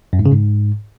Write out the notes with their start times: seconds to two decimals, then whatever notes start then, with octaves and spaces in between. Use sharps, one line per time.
0.13 F#2
0.19 G#2
0.26 C#3
0.32 G#2